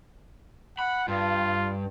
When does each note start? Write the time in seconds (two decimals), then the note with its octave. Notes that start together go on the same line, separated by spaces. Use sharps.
0.79 F#5 B5
1.08 G2 F4